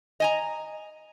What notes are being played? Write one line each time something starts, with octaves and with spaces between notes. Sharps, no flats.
D#5 G#5 A#5